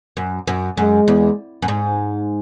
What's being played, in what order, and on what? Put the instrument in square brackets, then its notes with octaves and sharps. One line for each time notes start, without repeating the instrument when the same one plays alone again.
[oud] F#2
F#2
[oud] F#2 [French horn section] G#3
[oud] E2
F#2
G#2